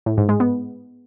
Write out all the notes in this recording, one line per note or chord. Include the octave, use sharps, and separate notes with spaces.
A2
G#2
G#3
B3